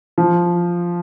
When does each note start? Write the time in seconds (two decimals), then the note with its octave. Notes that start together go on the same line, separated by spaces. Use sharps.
0.18 F3